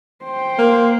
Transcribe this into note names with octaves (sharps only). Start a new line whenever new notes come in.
C5 G5
A#3